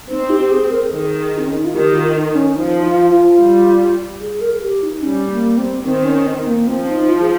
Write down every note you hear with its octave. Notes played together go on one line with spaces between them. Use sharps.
C4 D#4
G4
G4
G#4
A#4
D#3 G#4
C4
C#4
D#4
F4
D#3 G4
F4
D#4
C#4
F3 D#4
F4
F4
G3
G#4
A#4
G4
D#4
G3 C#4
A#3
C4
D#3 C4
C#4
C4
A#3
F3 C4
D#4
F4
G#4